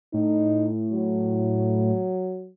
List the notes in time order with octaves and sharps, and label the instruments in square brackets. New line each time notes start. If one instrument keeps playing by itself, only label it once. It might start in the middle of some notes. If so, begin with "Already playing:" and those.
[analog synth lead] A2 [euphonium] D#4
[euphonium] F#3